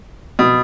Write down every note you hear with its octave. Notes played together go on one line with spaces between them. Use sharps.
B2